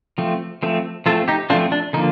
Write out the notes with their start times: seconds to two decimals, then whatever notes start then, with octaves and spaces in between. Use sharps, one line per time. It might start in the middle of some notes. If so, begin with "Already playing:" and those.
0.18 F3 A3 C4
0.63 F3 A3 C4
1.06 F3 A3 C4 F4 A4
1.28 D#4 G4
1.50 F3 A3 C4 D4 F4
1.72 D4
1.93 D3 F3 A#3 D#4